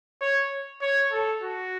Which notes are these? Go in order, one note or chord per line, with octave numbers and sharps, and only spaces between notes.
C#5
C#5
A4
F#4